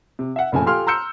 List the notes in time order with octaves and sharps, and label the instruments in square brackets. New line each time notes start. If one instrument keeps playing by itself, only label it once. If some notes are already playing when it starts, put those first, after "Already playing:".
[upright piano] C3
E5 F#5
F#1 A#2 C#3 F3 A3 G#5
F4 G4 A4 G#5 C6 F6
A#5 C6 E6 G6 C#7